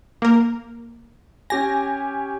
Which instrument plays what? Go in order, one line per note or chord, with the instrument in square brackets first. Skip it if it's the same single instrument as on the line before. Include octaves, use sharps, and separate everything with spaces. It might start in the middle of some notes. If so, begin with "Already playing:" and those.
[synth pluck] A#3 A#4
[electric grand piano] C#4 G4 G#5 [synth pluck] A#6